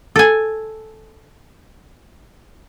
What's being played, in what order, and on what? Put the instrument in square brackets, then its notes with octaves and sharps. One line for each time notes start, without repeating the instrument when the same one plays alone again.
[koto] A4 G#5